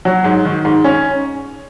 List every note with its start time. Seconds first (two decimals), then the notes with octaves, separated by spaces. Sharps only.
0.05 F#3
0.24 G#2
0.45 D#3
0.65 G#2
0.84 C#4